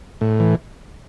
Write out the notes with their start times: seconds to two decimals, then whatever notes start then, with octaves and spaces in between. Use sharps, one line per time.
0.21 A2
0.40 E3